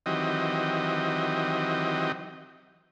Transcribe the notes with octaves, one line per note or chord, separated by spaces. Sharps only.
D#3 E3 F#3 C4 G4 D#5